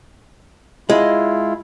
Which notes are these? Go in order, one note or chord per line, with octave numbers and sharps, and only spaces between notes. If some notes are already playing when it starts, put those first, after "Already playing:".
G#3 E4 F4